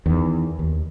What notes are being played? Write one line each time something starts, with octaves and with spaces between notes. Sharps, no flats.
E2 D#3
D#2